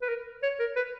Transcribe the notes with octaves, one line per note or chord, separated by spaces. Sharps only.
B4
A#4
C#5
A#4
B4